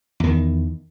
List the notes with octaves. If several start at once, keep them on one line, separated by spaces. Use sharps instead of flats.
E2 D#3